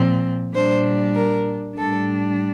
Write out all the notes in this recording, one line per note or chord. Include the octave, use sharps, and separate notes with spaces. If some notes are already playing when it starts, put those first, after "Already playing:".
Already playing: A#2 F3 C4
A#2 G3 D4 C5
A#4
A2 G3 D4 A4